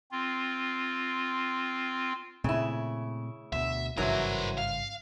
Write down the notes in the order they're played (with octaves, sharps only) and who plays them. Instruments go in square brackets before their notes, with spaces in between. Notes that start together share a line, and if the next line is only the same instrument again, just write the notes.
[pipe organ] C4 F4
[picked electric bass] A#2 A3 C4 [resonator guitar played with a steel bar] C#3 E4
[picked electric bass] D2 B2 [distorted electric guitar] E5
[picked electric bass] G#1 G2 C#3 [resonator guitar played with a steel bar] E3 F#3 [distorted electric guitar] A#4 C5
[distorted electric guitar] F5